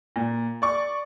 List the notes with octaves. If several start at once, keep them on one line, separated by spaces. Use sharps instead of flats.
A#2
D5 C#6